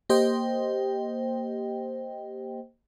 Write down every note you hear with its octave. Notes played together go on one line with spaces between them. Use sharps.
A#3 G4 C5 D#5 G5